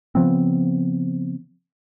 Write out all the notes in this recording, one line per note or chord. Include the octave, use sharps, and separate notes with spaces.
C#3 F3 B3 C4